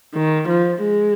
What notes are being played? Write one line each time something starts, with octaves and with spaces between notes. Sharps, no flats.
D#3
F3
G#3